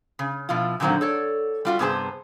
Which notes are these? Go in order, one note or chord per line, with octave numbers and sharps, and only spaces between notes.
C#3
B2 F3 E4 F4
A#2 D3 D#3 F#3 A#3 C4
A4 C#5 D5
G3 F4 F#4
G2 C3 B3 G#4 C5 A5